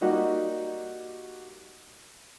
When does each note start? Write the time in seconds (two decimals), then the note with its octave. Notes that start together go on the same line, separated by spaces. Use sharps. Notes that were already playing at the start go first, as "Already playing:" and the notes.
0.01 G3 A#3 D#4 F#4 G4